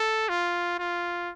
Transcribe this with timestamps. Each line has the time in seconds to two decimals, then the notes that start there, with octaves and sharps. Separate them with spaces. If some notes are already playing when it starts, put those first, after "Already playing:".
Already playing: A4
0.29 F4
0.79 F4